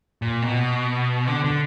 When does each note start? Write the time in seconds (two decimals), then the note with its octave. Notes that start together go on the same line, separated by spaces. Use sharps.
0.22 A#2
0.42 B2
1.27 D3
1.44 D3